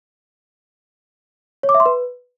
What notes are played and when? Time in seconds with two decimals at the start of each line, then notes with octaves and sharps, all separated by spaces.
1.63 C#5
1.69 D6
1.74 E5
1.80 C6
1.86 B4